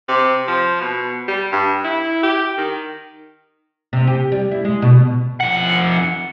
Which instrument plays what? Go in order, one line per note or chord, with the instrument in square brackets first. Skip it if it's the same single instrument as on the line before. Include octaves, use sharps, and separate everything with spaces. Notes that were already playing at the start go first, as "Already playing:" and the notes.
[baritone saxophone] C3
F3
B2
G3
G2
E4
G4
D#3
[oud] C3
G4
G3
E4
G#3
B2
[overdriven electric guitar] F2 F#5